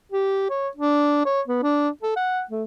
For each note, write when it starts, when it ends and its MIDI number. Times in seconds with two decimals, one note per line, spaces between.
0.12 0.48 67
0.50 0.69 73
0.77 1.24 62
1.25 1.41 73
1.48 1.60 59
1.63 1.89 62
2.03 2.13 69
2.16 2.43 78
2.51 2.63 57